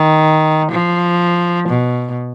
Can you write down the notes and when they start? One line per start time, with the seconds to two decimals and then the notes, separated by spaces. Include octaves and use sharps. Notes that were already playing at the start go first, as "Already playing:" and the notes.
Already playing: D#3
0.72 F3
1.69 B2